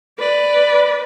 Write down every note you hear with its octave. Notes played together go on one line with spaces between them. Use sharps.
B4 D5